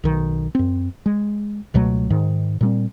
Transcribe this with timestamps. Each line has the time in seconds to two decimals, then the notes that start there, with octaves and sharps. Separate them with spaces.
0.04 B1 D#3
0.55 F#2 C4
1.06 G#3
1.74 C#2 B2 F#3 A3
2.10 G#2 D#3
2.61 A#2 G3 C4